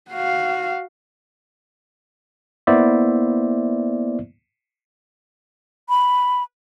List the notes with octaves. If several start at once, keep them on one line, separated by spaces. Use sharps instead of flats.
F#4 F5
A#3 B3 E4 C5 D5 E5
B5